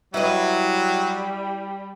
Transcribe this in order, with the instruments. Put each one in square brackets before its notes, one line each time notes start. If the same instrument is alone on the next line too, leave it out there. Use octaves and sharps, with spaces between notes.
[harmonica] F#3 [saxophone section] G3 [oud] E4 B4 D#5